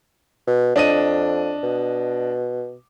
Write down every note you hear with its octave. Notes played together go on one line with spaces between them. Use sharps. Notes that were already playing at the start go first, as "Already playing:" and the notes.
B2
F2 D4 D#5 D#7
B2